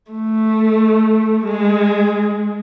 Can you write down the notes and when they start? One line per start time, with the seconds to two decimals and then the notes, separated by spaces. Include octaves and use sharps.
0.12 A3
1.45 G#3